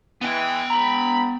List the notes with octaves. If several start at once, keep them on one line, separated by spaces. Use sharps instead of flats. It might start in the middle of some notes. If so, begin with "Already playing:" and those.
E3 G#3 B3 G5
G#2 A#5 B5